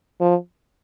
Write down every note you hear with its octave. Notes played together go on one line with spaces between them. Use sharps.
F3